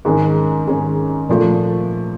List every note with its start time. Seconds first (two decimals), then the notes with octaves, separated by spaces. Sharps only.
0.05 G#2 D#3 G#3 C#4
0.67 G#2 D#3 G#3 C#4
1.29 A#2 F3 A3